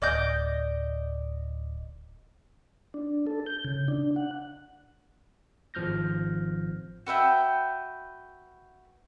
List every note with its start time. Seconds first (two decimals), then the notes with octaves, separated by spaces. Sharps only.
0.02 D1 D5 D#5 G6
2.94 D4
3.27 A4
3.46 G6
3.65 C#3
3.88 D4
4.16 F#5
5.74 G#1 F3 F6 G6 A#6
7.06 F#4 B4 E5 G5